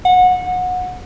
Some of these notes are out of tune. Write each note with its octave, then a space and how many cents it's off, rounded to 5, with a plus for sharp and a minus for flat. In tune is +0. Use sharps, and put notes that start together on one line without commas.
F#5 -25